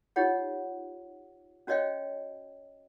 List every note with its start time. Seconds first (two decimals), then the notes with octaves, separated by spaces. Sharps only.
0.16 D#4 F4 G4 C#5 F#5
1.67 C#4 F#4 C#5 D#5 F5 G5